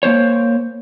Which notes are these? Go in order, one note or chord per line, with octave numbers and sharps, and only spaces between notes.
A#3 B3 C5 C#5